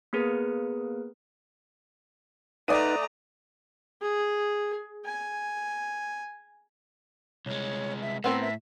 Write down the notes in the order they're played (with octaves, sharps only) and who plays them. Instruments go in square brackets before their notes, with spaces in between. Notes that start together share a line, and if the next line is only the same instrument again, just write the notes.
[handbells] A#3 B3 G#4 A#4 B4
[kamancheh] A3 A#5 [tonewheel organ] D#4 B4 F#5 [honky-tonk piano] D5 D#6 D#7
[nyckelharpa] G#4
G#5
[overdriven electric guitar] C2 G#3 [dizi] C#5
[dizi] E5
[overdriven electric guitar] A2 [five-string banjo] B3 C4 A#4 [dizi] E6
[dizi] E5